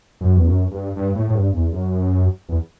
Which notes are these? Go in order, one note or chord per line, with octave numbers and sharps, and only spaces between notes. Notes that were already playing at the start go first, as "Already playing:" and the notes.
F#2
E2
F#2
G2
G2
A2
A2
G2
E2
F#2
E2